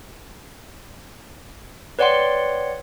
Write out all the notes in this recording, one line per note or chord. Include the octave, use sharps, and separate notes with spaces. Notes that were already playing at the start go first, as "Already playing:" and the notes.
B4 C#5 D5 F#5 G5 C6